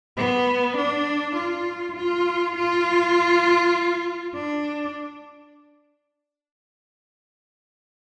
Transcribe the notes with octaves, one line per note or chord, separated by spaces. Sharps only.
B3
D4
F4
F4
F4
D4